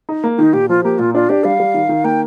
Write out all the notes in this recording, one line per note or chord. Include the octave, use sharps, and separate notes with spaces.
D#4
A#3
D#3 D#4
A#2 G4
F3 F4
A#3 G4
A#2 F4
D4 F4
D4 G4
G3 F5
G3
D#3
D#3
A#3 G5